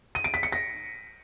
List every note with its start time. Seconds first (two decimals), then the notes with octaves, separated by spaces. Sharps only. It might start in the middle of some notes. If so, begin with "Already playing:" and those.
0.15 D#7
0.24 D7
0.34 B6
0.43 C#7
0.52 A#6